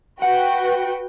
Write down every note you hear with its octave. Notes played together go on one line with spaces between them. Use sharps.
F#4 B4 F#5 G5